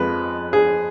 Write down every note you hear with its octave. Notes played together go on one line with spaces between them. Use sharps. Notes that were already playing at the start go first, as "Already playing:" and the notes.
Already playing: F2 F3 G#3 B4
G#4